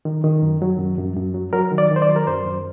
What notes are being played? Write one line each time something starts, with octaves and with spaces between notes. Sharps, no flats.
D#3
D#3
F#2
F#3
F#2
F#2
F#2
F#3
F#3 A#4
D#3
D5
D#3
C5
D5
F#3
A#4
F#2 C5
F#2